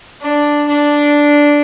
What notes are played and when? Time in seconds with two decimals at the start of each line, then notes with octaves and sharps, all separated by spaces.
0.22 D4
0.68 D4